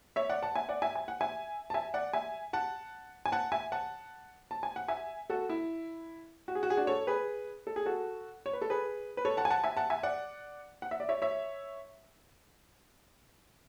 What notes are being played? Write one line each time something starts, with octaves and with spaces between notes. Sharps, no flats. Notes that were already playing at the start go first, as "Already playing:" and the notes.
C#5 E5
D5 F#5
F#5 A5
E5 G#5
D5 F#5
E5 G#5
G#5
F#5
E5 G#5
A5
E5 G#5
D5 F#5
E5 G#5
F#5 A5
G#5
F#5 A5
E5 G#5
F#5 A5
A5
G#5
F#5
E5 G#5
F#4 A4
E4
F#4
G#4
F#4
G#4
D4 F#4
A4 C#5
G#4 B4
A4
G#4
F#4 A4
C#5
B4
A4
G#4 B4
B4
A4 C#5
F#5 A5
G#5
F#5 A5
E5 G#5
F#5 A5
E5 G#5
D5 F#5
F#5
E5
D5
C#5 E5
C#5 E5